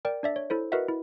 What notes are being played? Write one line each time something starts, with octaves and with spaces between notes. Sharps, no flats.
A#4 D5 G5
D4 D5 E5
C#5
E4 A4 C5
F#4 A#4 B4 D#5 E5 F#5
E4